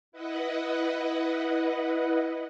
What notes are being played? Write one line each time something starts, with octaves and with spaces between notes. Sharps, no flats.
E4 B4 D#5 F#5